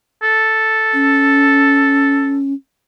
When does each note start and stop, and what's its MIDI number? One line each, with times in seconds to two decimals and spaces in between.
0.23 2.38 69
0.93 2.53 61